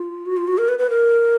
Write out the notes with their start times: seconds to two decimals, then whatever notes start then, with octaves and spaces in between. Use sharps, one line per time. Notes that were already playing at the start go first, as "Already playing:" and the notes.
Already playing: F4
0.26 F#4
0.37 F4
0.48 F#4
0.58 A#4
0.68 B4
0.79 B4
0.90 A#4